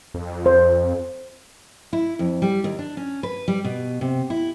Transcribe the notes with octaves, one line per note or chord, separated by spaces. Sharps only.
F2
C5
E4
F2
G3
D#2
D4
C#4
B4
G3
B2
C3
E4